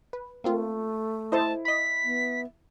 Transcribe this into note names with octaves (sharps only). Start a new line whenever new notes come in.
B4
A3 A#3 C4 F4
E4 A4 C5 D#5 A5
D#5 B5 B6
B3